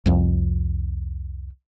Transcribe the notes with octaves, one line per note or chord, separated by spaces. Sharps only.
C2 F2 F3